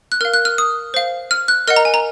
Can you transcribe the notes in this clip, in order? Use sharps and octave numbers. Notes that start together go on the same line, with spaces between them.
F#6
A#4 F5 F6
F#6
F6
D#6
C5 F5
F6
F#6
A#4 D#5 F#5 F6
A#5
G#5
A#5